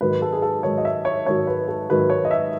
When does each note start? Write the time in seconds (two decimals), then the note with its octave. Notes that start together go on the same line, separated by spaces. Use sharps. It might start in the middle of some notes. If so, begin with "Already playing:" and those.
0.01 G#2 D#3 F#3 B4
0.22 A4
0.33 G#4
0.42 A4
0.63 G#2 D#3 F#3 C#5
0.78 D#5
0.85 E5
1.05 C#5
1.26 G#2 D#3 F#3 C#5
1.47 B4
1.68 A4
1.90 G#2 D#3 F#3 B4
2.10 C#5
2.25 D#5
2.31 E5